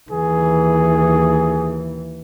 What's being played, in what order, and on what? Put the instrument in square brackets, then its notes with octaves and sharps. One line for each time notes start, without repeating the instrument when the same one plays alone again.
[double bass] D#2 E3 [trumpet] G#4